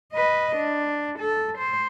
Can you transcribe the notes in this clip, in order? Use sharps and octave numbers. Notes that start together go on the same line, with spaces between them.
B4 D#5
D4
A4
C5